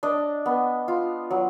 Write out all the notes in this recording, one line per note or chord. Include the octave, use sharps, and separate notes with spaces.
D4 D#5
B3
F4
F#3